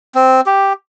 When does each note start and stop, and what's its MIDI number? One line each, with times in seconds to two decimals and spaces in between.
0.15 0.41 60
0.46 0.73 67